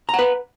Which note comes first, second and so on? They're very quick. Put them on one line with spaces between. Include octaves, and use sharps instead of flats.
A#5 F#5 B4